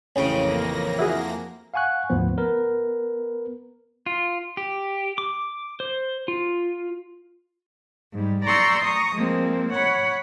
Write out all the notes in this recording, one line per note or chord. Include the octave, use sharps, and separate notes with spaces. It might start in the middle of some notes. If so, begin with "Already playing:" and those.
A1 F2 C#3 A#3 C#4 G5 A#6
E4 F#4 G#4
F5 F#5 G#5 C#6 F#6
D2 G#2 F3 B3 C5
B3 A#4 B4
F4
G4
D6
C5
F4
G#2 G3
D5 A#5 C6 C#6 E6 G6
A#5 C#6 D#6
F3 G#3 A#3 C4
C#5 F#5 B5